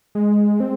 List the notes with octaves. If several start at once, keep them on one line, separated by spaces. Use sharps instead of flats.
G#3
C4